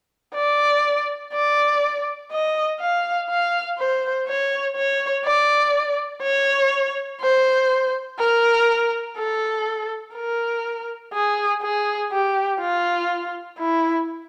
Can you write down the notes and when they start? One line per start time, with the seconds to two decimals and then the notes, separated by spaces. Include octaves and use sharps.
0.35 D5
1.33 D5
2.31 D#5
2.80 F5
3.29 F5
3.78 C5
4.28 C#5
4.76 C#5
5.25 D5
6.23 C#5
7.21 C5
8.19 A#4
9.18 A4
10.16 A#4
11.14 G#4
11.62 G#4
12.12 G4
12.60 F4
13.58 E4